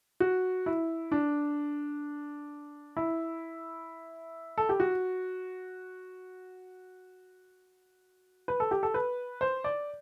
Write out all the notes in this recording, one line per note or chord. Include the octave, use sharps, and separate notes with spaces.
F#4
E4
D4
E4
A4
G4
F#4
B4
A4
G4
A4
B4
C5
D5